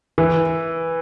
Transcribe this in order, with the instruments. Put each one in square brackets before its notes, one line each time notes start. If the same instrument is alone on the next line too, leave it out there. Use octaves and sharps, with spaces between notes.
[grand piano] E3